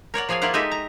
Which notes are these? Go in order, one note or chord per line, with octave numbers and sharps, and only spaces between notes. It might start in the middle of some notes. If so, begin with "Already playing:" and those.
A#4 C#5 D5 F#5
F3 G#4 D5 F5 G#5
A#3 E4 F4 D5 F#5
G#3 D#4 G4 A4 D#5 E5
A#5